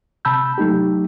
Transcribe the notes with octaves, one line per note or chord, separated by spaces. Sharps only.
C3 A5 B5 E6 G6
F#3 A3 D#4 G4